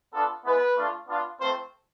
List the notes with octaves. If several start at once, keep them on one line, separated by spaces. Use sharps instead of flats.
B3 D4 F4 A4
G#3 B3 E4 B4
A3 D4 F4
B3 D4 F4
A3 C4 F4 C5